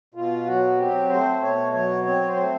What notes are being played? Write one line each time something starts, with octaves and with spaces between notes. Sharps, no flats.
B2 F4
F#3 F#4
C4 G4
A3 C5
B2 C#5
F#3 C#5
C4 C#5
C5
A3